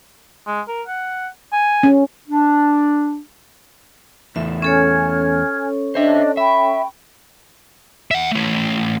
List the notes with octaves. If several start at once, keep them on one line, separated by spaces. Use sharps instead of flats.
G#3
A#4
F#5
G#5
C#4
D4
E2 A3 E5
C#4 A4 C#5 G#5 F6 G#6
D4 C5 D#5 E5
E5 G5 B5 C#6
E5 F#5
A3 C#4